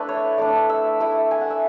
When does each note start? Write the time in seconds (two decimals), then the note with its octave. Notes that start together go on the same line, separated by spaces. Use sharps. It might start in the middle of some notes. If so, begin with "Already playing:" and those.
Already playing: A3 D4 E4 A4 B4
0.09 C#5
0.38 A3 D4 D5
0.69 E5
1.00 A3 E4
1.31 G#5
1.41 F#5
1.50 E5